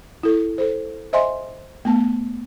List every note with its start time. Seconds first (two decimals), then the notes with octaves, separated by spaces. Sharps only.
0.23 E4 A4
0.58 A4 C5
1.13 C5 D#5 E5 G#5 C6
1.85 A3 B3 A5